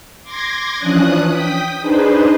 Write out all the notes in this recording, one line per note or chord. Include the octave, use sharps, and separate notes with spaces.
C6 D6 G#6 A#6
E3 F3 C#4 D4 D#6 F#6
G5 D#6 B6
D4 D#4 G#4 B4 C5